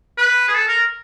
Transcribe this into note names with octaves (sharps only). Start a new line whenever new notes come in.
B4
G#4
A4
A#4